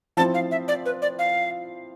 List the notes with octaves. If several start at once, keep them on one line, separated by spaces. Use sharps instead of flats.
F3 C4 E4 A5
F5
E5
D5
B4
D5
F5